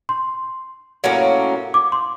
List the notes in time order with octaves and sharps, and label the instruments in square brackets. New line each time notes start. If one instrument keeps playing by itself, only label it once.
[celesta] C6
[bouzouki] A2 F#3 A#3 C#4
[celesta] D6
C6